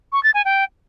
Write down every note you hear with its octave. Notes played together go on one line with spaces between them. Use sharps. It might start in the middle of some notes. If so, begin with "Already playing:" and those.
C#6
A6
G#5
G5